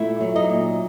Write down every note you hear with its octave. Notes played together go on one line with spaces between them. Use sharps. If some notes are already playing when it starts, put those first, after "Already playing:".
Already playing: A#2 A3 E4 E5
F#3
D#4 D#5
A#2